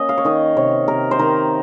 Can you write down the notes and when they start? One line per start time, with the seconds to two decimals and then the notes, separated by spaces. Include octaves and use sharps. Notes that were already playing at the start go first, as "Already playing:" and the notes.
Already playing: A#3 C#4 D#5
0.09 F5
0.18 C#5
0.25 D#3 D#5
0.57 C3 C#5
0.88 C3 A#4
1.11 C5
1.19 D#3 A#4